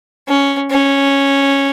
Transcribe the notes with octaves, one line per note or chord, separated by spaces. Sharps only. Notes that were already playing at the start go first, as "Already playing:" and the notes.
C#4
C#4